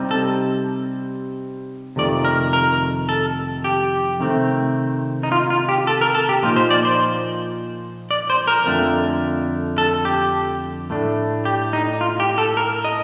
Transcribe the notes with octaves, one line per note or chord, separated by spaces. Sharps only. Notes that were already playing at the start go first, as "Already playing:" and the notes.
Already playing: C3 G3 C4 D#4
A4
F2 C3 D#3 A3 D5
A#4
A#4
A4
G4
C3 D#3 A3 C4
D#4
F4
F4
G4
A4
A#4
A4
G4
A#2 F3 A#3 D#4 F4
C5
D5
C5
D5
C5
A#4
F2 D3 A3
A4
G4
A2 A3 D4
G4
D#4
F4
G4
A4
A#4
D#5